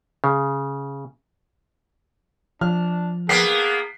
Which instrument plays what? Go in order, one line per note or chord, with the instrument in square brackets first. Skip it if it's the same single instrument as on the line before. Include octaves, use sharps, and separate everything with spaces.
[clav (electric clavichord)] C#3
[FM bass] F3 [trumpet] D4 [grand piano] F6
[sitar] A#3 B3 [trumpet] G#4 [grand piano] B6 C7 D7